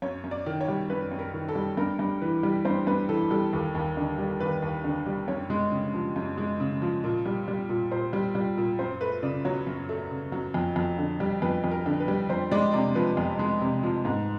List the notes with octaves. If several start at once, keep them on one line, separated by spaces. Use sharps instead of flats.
F#2 C#5
F#2
D5
D#3
C#5
G3
F#2 B4
F#2
A#4
D#3
A4
G3
G2 A#4
G2
E3 B4
G3
G2 C5
G2 B4
E3 A4
G3 A4
D#2 A4
D#2
D3
G3
D#2 B4
D#2
D3
G3
F#2 C#5
G#3
C#3
F3
F#2
G#3
C#3
F3
A#2
G3
G3
A#2
A#2 C5
G3
G3
A#2
F#2 C5
A3 B4
C#3 D5
F#3 C#5
F#2
A3
C#3
F#3
F2
F2
D3
G3
F2 B4
F2
A#4
D3
B4
G3
F2 C5
G#3 D5
C3 D5
F3 B4
F2
G#3
C3
F3
G#2